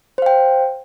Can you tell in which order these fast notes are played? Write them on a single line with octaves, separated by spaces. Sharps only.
C5 F5 G5